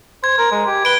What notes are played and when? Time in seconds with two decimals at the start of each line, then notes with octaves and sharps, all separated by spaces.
0.24 C5 G#6
0.38 A#4
0.52 G#3
0.67 G4
0.85 B4 D7 G7